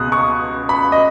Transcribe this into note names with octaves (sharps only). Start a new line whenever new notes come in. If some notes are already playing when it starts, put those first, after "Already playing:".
Already playing: C#2 B2 D#6 F#6
C#6
B5
D#5